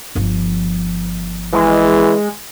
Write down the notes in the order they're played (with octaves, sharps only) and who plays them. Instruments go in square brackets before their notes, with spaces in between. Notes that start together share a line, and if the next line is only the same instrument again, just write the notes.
[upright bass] G1 F3
[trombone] E3 [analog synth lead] G#3